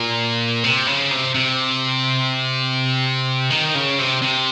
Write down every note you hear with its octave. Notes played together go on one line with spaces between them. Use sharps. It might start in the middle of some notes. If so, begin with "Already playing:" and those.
Already playing: A#2
C3
C#3
C3
C3
D#3
C#3
C3
C3